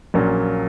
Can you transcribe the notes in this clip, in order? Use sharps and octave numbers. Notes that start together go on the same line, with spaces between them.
A#1 A#2 F#3 A#3 C#4